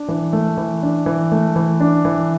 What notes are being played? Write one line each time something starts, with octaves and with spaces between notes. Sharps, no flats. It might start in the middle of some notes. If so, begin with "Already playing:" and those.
Already playing: D4
E3
A3
E3
D4
E3
A3
E3
D4
E3